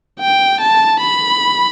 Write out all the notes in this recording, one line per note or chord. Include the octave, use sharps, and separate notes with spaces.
G5
A5
B5